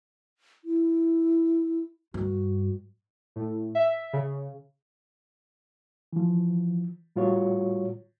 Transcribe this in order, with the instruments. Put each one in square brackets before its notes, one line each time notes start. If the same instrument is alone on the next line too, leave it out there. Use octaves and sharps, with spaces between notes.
[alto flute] E4
[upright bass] G2 [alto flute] F#4
[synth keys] A2
E5
C#3
[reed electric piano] E3 F3
A2 G3 F4 F#4 C#5